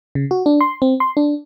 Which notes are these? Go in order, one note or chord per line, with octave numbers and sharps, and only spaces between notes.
C#3
F#4
D4
C6
C4
C6
D4